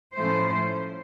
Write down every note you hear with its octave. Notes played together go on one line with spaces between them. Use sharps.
A2 F3 A3 C#4 E4 C5